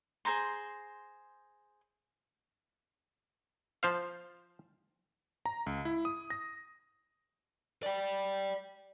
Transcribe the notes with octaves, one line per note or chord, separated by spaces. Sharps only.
G#4 C5 A#5 C6
F3 C5 F5
A#5
C#2
E4
D#6
A#6
D5 G5